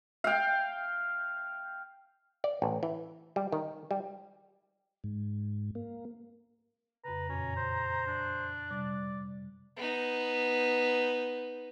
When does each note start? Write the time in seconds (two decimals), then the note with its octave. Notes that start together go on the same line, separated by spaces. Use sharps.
0.24 F5 G5
2.44 D5
2.62 A1
2.83 E3
3.36 G3
3.52 D#3
3.91 G3
5.04 G#2
5.75 A#3
7.05 F2 C#3 B4 A#5
7.29 F#2 A#2 C#4
7.56 C5
8.07 D4
8.70 C3 G3 D5
9.76 B3 D#4